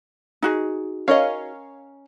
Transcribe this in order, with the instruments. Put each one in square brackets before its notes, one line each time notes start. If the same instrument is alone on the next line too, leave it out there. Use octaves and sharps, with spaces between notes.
[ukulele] D#4 F#4 G#4
[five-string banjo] C#4 A#4 D#5 [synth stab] C#5 F5